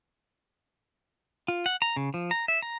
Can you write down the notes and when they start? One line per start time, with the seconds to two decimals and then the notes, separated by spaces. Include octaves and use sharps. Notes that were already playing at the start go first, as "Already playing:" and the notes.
1.48 F4
1.66 F#5
1.82 A#5
1.96 C#3
2.14 F3
2.31 A#5
2.48 E5
2.62 A#5